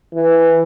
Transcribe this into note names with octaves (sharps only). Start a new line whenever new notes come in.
E3